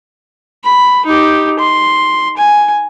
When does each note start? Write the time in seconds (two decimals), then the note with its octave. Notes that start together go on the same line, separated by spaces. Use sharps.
0.64 B5
1.06 D#4 G4
1.59 C6
2.37 G#5